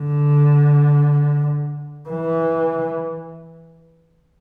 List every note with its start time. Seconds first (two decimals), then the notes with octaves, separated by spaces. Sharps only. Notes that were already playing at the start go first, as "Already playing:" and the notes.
Already playing: D3
2.09 E3